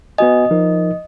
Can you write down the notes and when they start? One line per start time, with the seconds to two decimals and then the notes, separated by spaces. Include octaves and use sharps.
0.18 B3 F#4 D#5 G#5
0.51 F3 D#4 A#4